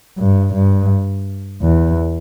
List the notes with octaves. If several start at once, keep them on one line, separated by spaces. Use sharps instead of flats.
G2
G2
E2